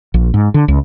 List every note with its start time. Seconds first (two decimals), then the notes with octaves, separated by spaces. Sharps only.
0.14 A#1
0.34 G#2
0.54 D3
0.68 C#2